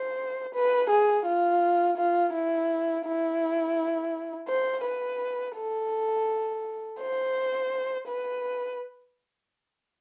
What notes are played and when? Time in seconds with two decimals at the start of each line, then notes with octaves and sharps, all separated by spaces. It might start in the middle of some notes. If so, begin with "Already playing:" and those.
Already playing: C5
0.54 B4
0.90 G#4
1.26 F4
1.97 F4
2.33 E4
3.05 E4
4.49 C5
4.85 B4
5.57 A4
7.00 C5
8.08 B4